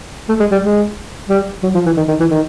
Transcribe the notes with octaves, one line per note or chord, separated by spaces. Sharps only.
A3
G#3
G3
G#3
G3
F#3
F3
E3
D#3
D#3
E3
D#3